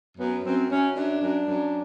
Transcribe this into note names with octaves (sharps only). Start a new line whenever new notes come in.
F#2 B3
F#2 C4
F#2 C#4
F#2 D4
F#2
F#2